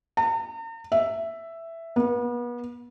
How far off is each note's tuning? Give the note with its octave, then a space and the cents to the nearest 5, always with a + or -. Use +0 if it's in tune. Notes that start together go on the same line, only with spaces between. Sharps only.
A#5 -45
E5 +5
B3 -35